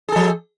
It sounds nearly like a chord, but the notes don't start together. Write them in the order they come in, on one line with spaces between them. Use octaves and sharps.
G#4 A4 F3